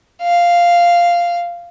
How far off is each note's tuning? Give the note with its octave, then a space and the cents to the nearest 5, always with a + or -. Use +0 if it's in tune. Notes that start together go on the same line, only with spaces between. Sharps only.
F5 -5